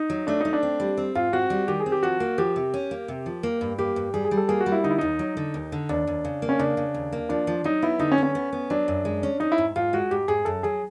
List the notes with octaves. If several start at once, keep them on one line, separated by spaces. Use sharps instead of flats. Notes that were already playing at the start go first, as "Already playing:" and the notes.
Already playing: D#4
F#3
A3 D4
A3 D#4
D4
C4
G3
C4
G#2 F4
C4 F#4
G3
D#3 G4
G#4
C4
G4
F3 F#4
A#3
F3 G4
C3
C#4
A#3
C3
F3
A#3
G2
A#3 G4
G2
G3 G#4
G#4
G3
A4
A#3 G#4
F#4
G3
E4
D3 D#4
E4
D#2 D#4
F#3
D3
D#2
D3
D#2 D4
D#2
C#3
A#3
C#4
C#3 D4
C#3
D#2
A#3
F3 D4
F3
F#3 D#4
B3 E4
D3 D#4
C#4
B3
C#4
B3
B3
F#3 D4
F#2
G#3
C#4
C#4 D#4
E4
G#2
G#2 F4
G#3 F#4
G#2 G4
G#2 G#4
F#2 A4
F#3 G#4